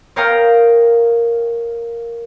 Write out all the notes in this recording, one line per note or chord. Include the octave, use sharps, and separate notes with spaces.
A#4 C#5 F5 G5 A#5 D#6